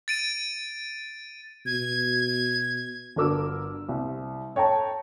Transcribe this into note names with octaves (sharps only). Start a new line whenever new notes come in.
A6 D7 D#7
B2 G#6
G1 D4 F#4 A#4 D6 E6
C2
A4 C#5 G5 A5 A#5